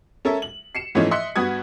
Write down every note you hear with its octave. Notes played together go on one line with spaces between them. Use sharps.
C#4 A4 A#4 E5
F#7
C7 C#7 E7
G#2 E3 F3 A3 C#4 D#4
D#5 E5 C6 F#6 B6 C#7
G2 B3 F#4 F#5 D#6 G#6